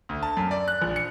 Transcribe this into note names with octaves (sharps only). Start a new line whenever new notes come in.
D2
A5
F#2
D5
F#6
A#1
C#7